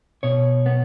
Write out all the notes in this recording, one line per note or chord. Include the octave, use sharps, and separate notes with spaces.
B2 C#5
B3